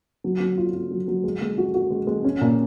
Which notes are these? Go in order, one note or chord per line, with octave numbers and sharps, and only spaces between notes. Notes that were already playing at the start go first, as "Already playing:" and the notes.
F#3
F#3
F4
F4
F#3
F#3
G#3
G#3
F#4
F#4
G#3
G#3
C#4
A#2